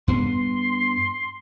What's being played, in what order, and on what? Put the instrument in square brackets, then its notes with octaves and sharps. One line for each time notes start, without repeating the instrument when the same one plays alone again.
[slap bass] G2 B3 [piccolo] C6